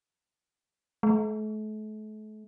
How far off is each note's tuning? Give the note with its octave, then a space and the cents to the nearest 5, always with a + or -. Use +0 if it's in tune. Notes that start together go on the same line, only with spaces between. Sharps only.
A3 -40